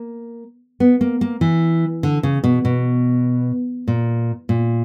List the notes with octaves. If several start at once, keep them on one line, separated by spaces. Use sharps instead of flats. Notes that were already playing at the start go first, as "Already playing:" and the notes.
Already playing: A#3
B3
A#3
A#3
E3
D3
C#3
B2
B2
A#2
A#2